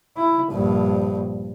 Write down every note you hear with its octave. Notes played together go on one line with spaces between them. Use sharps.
E4
A#1 G2